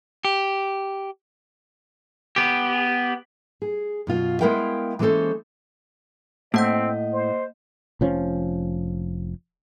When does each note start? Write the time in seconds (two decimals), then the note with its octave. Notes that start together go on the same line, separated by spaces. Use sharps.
0.25 G4
2.36 B3 G4
3.62 G#4
4.07 F#2 B2 F4 F5
4.41 G#3 B3 E4 A#4 F5 G5
4.99 E3 G#3 A#3 C#4 A4 C5
6.54 A2 A#3 C4 D#5 F#5 G6
7.13 C5
8.01 F1 F3 C#4